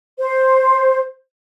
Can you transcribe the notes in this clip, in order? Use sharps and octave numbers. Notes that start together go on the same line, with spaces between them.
C5